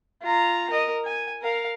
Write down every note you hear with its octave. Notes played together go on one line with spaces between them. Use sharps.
F4 A#5
A#4 D#5
G#5
A#4 F5